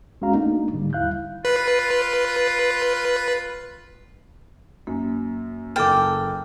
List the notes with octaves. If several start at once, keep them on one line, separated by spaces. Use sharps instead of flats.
D2 G#3 C#4 F#4 F5 A#5
A3 A#3 D4 D#4
G#2 D3 G3
D#2 E4 F5 F#6 G6
F4 B4
F#2 A#3
F#1 A4 G5 D6 F6 A6